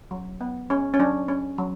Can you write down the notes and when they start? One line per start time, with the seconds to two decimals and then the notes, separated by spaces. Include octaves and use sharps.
0.11 F#3
0.41 B3
0.70 C#4
0.94 C#4
0.99 F#3 D4
1.29 C#4
1.58 F#3